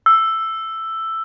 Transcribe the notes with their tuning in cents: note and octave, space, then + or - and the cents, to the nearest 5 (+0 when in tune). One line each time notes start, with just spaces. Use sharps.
E6 +5